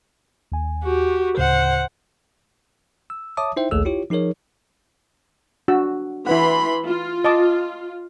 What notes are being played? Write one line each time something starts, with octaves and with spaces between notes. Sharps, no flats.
D#2 G#5
F#4 G4
D2 A2 C#3 C5 F#5
E6
C#5 E5 A5 D6 D#6
D#4 E4 C5 E5 G5
A#1 D#2 A3 G#4 A4 E6
E4 F4 G4 C#5
F3 D#4 G#4 A#4 C#5
D4 F#4 E6
E3 E4 B4 F#5 B5 C6
F4
D#5 A5 D6